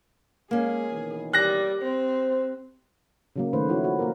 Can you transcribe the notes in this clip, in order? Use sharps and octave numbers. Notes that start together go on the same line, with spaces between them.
G#3 A#3 C#4 G#4
B2 D#3 E3
G3 F#6 A#6
C4 C5
C#3 F#3 A#3
D#3 A3 B4 C5
F3 E4 F#4 C#5
F#4
A#3 A#4